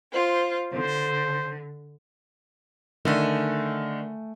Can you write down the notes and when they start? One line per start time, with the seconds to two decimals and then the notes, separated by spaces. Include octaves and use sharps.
0.11 F4 C5
0.72 D3 C5
3.05 D3 D#3 A3 G#5